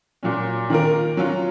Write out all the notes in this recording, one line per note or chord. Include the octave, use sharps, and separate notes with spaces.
A#2 F#3 C#4
D#3 A#3 F4 A#4
F#3 C#4 F4